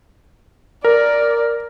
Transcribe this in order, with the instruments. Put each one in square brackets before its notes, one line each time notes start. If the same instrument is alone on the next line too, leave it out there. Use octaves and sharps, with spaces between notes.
[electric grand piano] A#4 [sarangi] D5